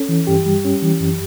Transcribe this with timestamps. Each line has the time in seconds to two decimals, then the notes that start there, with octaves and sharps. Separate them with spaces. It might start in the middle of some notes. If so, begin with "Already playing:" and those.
Already playing: C#4 A4
0.09 E3
0.27 G2 G4
0.46 G3
0.65 C#4
0.82 E3
1.00 F#2